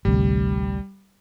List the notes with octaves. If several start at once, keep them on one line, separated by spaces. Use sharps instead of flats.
A1 D2 C3 G3